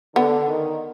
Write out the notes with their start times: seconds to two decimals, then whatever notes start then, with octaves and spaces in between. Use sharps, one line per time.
0.15 D3 B3
0.48 D#3